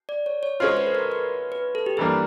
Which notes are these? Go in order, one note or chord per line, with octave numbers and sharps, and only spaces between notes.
D5
C#5
C#5
G#3 C#4 F4 C5
B4
A4
A#4
B4
B4
A4
G4
G2 E3 G3 A#3 G#4